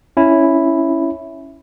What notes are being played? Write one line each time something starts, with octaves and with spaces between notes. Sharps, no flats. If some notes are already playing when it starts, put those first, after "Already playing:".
C#4 E4